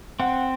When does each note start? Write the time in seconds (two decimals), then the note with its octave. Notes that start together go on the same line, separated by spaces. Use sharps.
0.20 C4 F#5